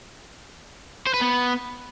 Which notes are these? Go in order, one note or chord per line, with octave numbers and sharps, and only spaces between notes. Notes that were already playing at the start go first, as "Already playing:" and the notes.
C5
B4
B3